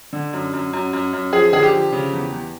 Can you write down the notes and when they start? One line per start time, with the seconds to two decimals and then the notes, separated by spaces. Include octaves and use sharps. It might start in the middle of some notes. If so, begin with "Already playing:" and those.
0.13 D3
0.33 F#2
0.53 F#2
0.73 F#2
0.93 F#2
1.13 F#2
1.33 F3 G#4
1.52 D3 G#4
1.63 G4
1.73 F3
1.93 C#3
2.13 E2
2.32 E2